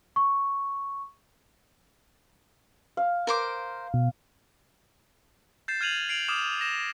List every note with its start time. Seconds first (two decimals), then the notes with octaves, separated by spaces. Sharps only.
0.16 C#6
2.97 F5
3.27 A#4 C5 D6
3.94 B2
5.68 G6 A6 C7 E7
5.81 F6 G#6 D#7 F7 F#7
6.09 C7 D7 F7 F#7
6.28 D6 D#6 F6 E7 F#7
6.61 A#6 E7